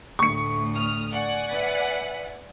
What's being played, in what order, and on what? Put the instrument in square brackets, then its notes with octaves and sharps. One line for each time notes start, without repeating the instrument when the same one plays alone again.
[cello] D2 A2 [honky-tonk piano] C#6 C#7
[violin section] D#6 F6
D5 F#5 G#5
[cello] B4 E5